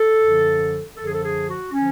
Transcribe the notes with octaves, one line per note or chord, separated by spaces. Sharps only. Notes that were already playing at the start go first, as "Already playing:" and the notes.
Already playing: A4
F#2 D3 F3
F#2 D3 F3 A4
G#4
A4
G#4
F#4
D3 F3 C#4